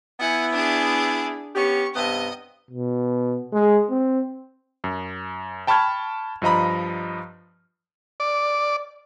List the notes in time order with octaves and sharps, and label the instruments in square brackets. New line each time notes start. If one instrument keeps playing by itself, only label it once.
[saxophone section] B3 E4 [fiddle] F#5 G#5
[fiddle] D4 G#4
[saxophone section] B3 C#4 G4 [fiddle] C#6
[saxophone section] G2 C3 B3 [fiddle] D#5
[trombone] B2
G#3
C4
[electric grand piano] F#2
G5 A5 B5 C#6 F6 G#6
G2 F3 D#5 A#5 B5
[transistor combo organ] D5